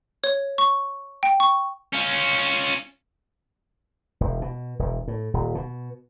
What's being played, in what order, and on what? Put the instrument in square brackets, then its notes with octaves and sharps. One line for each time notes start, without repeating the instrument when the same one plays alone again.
[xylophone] C#5
C#6
G5
C#6
[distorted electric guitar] C#4 F4
[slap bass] E1
B2
E1
A2
D#1
B2